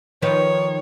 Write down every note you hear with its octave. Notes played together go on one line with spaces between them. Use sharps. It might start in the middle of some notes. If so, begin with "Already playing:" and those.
D#3 F3 B4 C#5